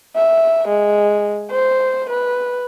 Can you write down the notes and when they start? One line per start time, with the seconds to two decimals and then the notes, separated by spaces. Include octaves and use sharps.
0.16 E5
0.68 G#3
1.51 C5
2.09 B4